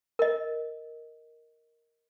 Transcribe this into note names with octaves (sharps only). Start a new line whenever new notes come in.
A#4 D#5